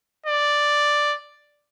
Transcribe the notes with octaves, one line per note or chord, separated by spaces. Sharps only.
D5